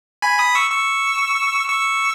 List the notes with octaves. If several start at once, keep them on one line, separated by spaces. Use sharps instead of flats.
G#5 B5
B5 D#6
C#6 E6
C#6 E6
C#6 E6